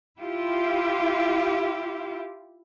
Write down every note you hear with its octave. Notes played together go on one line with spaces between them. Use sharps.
E4 F4 G4